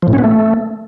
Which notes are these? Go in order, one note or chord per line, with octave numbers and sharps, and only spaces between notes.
F3
A2
C#4
B3
A3